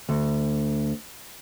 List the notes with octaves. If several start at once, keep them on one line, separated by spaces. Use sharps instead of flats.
D2